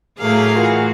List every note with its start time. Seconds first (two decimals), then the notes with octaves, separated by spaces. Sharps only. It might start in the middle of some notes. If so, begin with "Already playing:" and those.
0.19 A2 F#3 A3 A#3 G#4 F5
0.56 E3 F4 F#4 A#4